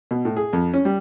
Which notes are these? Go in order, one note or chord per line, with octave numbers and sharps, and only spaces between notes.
B2
A2
G#4
F2
C#4
G3